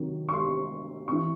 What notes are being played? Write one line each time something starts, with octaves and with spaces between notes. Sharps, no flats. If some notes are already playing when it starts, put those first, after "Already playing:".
Already playing: C3 D#3 F#3
C#6
C6
E3 C4 C#6